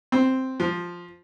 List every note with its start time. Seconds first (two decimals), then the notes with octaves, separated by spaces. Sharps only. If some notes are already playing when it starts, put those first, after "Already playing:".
0.12 C4
0.60 F3